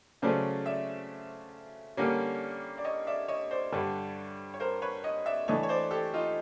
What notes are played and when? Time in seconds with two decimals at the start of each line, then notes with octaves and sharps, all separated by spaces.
0.22 C#3 F#3 A3 C#4 C5 D5
0.66 D5 E5
1.97 D3 G3 A#3 C#4
2.78 D5
2.84 C#5 D#5
3.07 D5 E5
3.28 C#5 D#5
3.51 C5 D5
3.72 G2 D3 G3 B4 C#5
4.54 C#5
4.60 A#4 C5
4.82 B4 C#5
5.04 C#5 D#5
5.26 D5 E5
5.48 E3 A3 D4 C#5 D#5
5.63 C#5
5.69 C5 D5
5.91 G4 A4
6.14 D#4 F4